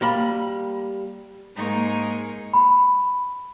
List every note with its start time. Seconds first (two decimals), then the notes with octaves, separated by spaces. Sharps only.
0.01 G3 A#3 B5
1.56 G#2 G#3 A#3 D#4 A#4 C#6
2.54 B5